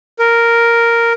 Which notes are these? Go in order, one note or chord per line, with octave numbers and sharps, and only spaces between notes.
A#4